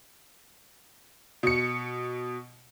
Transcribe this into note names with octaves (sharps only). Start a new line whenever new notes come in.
B2 C#7